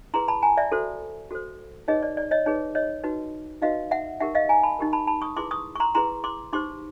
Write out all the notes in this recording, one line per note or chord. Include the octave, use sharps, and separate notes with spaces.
E4 G#4 B4 A#5 C6
A5 B5
G#5 A#5
D5 E5
F#4 A4 C5
F#4 A4 C5
D#4 G#4 B4 C#5 D#5
D5
D5
C#5 D#5
D#4 G#4 B4 C#5
C#5 D#5
D#4 F#4 B4
D#4 F#4 B4 D#5 F5
E5 F#5
D#4 G4 A#4 E5 F#5
D#5 F5
G#5 A#5
A5 B5
D#4 G4 A#4
A5 B5
A5 B5
C#6 D#6
E4 G#4 B4 C6 D6
C#6 D#6
C#6
A#5 C6
E4 G#4 B4 A#5 C6
C6 D6
D#4 G4 C5 C6 D6